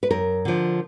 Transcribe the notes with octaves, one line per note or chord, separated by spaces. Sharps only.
B4
F#2 A#4
D3 F3